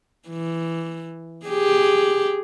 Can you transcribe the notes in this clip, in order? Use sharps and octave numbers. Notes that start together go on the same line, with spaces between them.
E3
G4 G#4